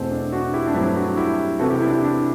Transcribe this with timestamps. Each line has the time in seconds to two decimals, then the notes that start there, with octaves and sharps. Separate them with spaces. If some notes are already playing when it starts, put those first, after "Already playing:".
Already playing: E2 B2 A3 C4
0.11 D4
0.32 D4 F#4
0.53 E4 G4
0.67 D4
0.74 G2 F#3 A3 C4 E4
0.96 D4 F#4
1.08 F#4
1.17 E4 G4
1.60 C3 E3 B3 F#4 A4
1.70 E4 G4
1.81 E4
1.87 D4
1.92 E4
2.02 D4